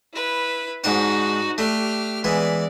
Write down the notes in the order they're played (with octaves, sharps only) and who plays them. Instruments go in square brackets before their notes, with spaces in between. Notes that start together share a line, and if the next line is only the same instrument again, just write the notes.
[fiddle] E4 B4
[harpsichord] G#2 D4 F#5 [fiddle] D#4 F#4
[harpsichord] A3 D4 [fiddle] G4 F6
[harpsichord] E3 G#3 B3 [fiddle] D5